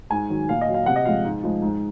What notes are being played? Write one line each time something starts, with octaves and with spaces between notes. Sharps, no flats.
G#2 G#5
D#3 F#3
A#2 F5
D#5
F#3
F5
C3 F#5
D#5
F3 G#3 F5
G#2
F3 G#3
G#2